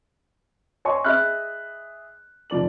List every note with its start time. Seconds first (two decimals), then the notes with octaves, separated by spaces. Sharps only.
0.85 C#5 D#5 G#5 C6 C#6
1.05 G#4 D#5 E5 B5 F6 F#6
2.50 F1 F3 D5 F#7